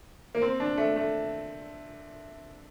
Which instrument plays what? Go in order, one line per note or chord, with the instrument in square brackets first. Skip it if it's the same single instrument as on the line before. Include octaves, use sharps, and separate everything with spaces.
[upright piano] A#3
C4
D4
A3
A3